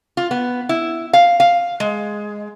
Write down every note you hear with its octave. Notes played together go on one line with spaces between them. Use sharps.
F4
B3
E4
F5
F5
G#3